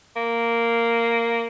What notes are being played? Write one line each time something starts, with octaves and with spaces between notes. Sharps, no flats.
A#3